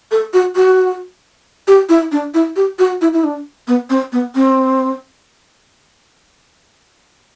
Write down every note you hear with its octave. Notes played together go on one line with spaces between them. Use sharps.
A4
F#4
F#4
G4
E4
D4
E4
G4
F#4
E4
E4
D4
B3
C4
B3
C4